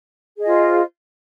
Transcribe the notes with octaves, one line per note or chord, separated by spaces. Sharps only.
F4 G#4 C5 D#5